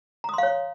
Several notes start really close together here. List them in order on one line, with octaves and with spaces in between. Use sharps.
A#5 D#6 C6 F5 C#5